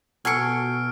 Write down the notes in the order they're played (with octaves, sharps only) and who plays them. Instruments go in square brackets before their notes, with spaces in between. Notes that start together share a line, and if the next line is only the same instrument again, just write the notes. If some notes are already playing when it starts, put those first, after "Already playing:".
[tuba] B2 [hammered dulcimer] F#4 A4 [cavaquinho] G#5 C#6 [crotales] F6 C7 D7